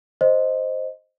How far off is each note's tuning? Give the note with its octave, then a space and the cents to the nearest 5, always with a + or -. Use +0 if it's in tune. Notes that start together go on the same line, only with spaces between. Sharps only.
C5 +0 D#5 +0